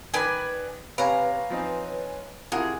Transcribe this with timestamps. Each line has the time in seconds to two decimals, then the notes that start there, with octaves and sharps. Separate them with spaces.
0.14 D#3 B4 D5 G#5 B5
0.98 C3 B4 C#5 F5 G#5 A#5
1.50 F3 C4 D#4
2.52 C3 E4 F4 G#4 A#4 F#5